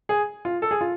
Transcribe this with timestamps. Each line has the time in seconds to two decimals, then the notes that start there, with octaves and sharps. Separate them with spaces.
0.09 G#4
0.45 F4
0.62 A4
0.71 G#4
0.81 F4